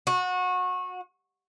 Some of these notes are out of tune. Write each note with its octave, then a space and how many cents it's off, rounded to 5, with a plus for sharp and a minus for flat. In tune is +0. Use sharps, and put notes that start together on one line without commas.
F#4 -25